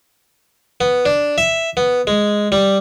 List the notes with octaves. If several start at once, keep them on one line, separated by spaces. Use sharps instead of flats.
B3
D4
E5
B3
G#3
G3